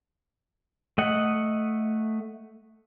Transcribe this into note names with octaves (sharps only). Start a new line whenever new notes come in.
A3 D#5 F#5